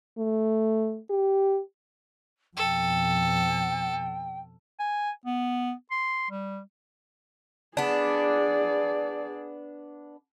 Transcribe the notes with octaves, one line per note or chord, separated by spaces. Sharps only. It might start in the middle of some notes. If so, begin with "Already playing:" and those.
A3
G4
F2 B2 A4 G5
G#5
B3
C6
G3
B3 D4 G#4 D5